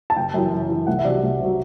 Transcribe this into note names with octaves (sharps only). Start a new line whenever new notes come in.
A5
F#1 G5
F#2 E3
F#1
F#2 E3
C2 F#5
E5
C3 F#3 D5
C2
C3 F#3